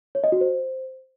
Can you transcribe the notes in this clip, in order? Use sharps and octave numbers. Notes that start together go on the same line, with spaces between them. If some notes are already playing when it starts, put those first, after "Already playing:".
C#5
D#5
F#4
C5